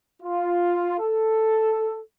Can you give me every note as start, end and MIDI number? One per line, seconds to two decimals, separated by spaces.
0.23 0.99 65
1.00 1.99 69